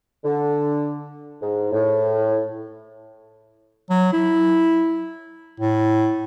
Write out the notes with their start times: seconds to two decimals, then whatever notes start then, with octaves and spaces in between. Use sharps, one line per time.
0.24 D3
1.42 G#2
1.72 A2
3.90 F#3
4.13 E4
5.60 A2